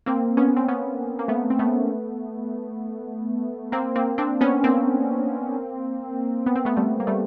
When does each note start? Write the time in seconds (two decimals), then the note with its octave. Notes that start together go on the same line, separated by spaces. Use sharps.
0.06 A#3 C4
0.37 B3 C#4
0.57 C4
0.68 B3 C#4
1.19 A#3
1.28 A3 B3
1.50 C4
1.59 A3 B3
3.72 A#3 C4
3.96 A#3 C4
4.18 C4 D4
4.41 B3 C#4
4.64 A#3 C4
6.46 B3
6.56 C4
6.65 A3 B3
6.77 G3 A3
7.00 A#3
7.07 G3 A3